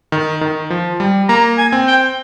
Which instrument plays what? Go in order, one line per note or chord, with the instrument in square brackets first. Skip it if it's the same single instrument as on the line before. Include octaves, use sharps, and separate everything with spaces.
[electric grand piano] D#3
D#3
F3
G3
[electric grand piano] A#3 [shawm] A#5
[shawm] G#5
[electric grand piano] C4
[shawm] G5